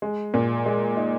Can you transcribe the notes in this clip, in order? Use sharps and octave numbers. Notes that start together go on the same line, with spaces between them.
G#3
A#2
G#3
D#4